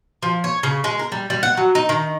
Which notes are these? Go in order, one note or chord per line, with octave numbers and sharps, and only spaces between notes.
F3
C#5
C#3
G#3
A#4
G3
G3
F#5
F#3
D#4
D#3